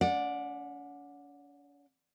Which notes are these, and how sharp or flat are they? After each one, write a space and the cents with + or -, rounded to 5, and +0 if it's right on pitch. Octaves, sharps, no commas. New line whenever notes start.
C#4 +40 D5 +0 F#5 -25